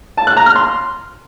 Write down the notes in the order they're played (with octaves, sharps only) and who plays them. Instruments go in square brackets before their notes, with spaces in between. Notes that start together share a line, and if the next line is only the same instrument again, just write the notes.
[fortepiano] A5
F#6
A#5
F6
C6